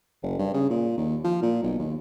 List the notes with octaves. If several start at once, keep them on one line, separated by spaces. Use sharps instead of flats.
F#1
G2
C#3
A#2
D#2
F3
A#2
B1
D#2